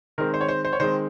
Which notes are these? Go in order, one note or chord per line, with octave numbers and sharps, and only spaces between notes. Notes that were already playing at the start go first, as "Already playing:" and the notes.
D#3 G#3 C4 A#4
C5
C#5
C5
C5
C#5
D#3 G#3 C4 C5